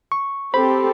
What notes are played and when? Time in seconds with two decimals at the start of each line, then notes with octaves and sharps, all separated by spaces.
0.12 C#6
0.54 C4 G4 A4 C5 B5